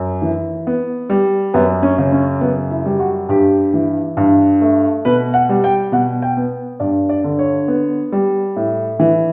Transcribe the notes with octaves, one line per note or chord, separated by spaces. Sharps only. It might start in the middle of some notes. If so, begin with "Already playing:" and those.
Already playing: F#2
E3
B3
G3
F#2 B3
C#4
C#3
C#4
F#2 B3
E4
G3
F#4
G2 G4
E3
G2
A3
B2 B4
F#5
G3
G5
B2 F#5
G5
B3
G2 D5
D5
D3
C#5
B3
G3
A2
E3